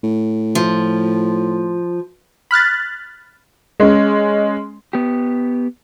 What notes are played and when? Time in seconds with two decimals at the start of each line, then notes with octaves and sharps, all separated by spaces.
0.04 A2
0.55 F3
2.51 B5 F6 F#6 A6
3.80 G#3 C#4
4.93 B3 G4